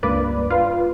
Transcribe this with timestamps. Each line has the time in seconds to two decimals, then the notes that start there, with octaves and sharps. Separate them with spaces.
0.03 C#2 G2 A#3 B4 D5
0.50 F4 B4